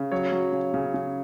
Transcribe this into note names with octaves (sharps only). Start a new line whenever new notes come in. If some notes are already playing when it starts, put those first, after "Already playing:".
Already playing: C#3
F#3 C#5
F#3
C#3
C#3
C#3